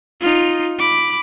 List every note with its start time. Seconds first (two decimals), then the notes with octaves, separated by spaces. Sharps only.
0.21 D#4 F4
0.79 B5 D6